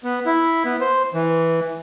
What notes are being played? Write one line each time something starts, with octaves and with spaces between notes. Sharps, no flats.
B3
E4
B3
C5
E3